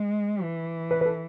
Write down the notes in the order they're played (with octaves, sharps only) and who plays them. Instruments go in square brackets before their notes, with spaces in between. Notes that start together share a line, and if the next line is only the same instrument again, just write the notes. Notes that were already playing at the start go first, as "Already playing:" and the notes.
Already playing: [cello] G#3
E3
[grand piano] B4
B4
A4